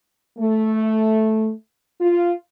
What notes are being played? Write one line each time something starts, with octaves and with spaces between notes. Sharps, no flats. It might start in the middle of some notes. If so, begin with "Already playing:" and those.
A3
F4